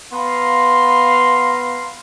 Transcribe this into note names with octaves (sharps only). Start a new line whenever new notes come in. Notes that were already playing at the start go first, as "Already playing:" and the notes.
B3 F5 A#5 C6